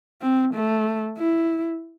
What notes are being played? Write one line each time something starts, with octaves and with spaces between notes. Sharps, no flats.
C4
A3
E4